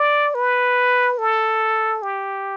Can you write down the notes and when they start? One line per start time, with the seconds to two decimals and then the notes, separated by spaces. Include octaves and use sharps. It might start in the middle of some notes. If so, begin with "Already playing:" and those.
Already playing: D5
0.35 B4
1.18 A4
2.03 G4